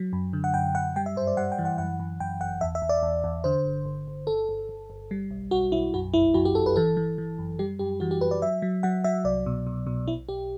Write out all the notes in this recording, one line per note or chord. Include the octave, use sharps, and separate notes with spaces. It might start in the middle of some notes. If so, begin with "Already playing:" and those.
Already playing: F#3
F#2
D3
F#5
F#2 G5
F#2 F#5
G3 G5
E5
G2 C5
D5
G3 F#5
G5
E3
F#5
F#2 F#5
F#2
F#2 G5
G1 F#5
E2 E5
E5
E2
D5
E2
E2
D3 C5
G1
G1
G1
G1 A4
G1
G1
G1
G3
B1
B1 F#4
B1 E4
F#2 F#4
G1 E4
F#2 F#4
G4
G1 A4
B4
E3 A4
E3
E3
F#2
G3 G4
F#2 G4
E3 F#4
G4
F#2 B4
D5
F#3 E5
F#3
F#3 F#5
F#3 E5
C2 D5
B2
B2
B2
B1 E4
B1 G4